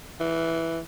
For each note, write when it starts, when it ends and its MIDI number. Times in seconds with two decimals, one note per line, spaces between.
0.20 0.79 52